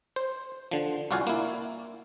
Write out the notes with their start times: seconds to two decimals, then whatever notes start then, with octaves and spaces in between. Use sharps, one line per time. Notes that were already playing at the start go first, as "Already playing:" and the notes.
0.16 C5
0.71 D3 F3
1.11 C2 F4 F#4 D5 F5 G#5
1.27 A#3 E4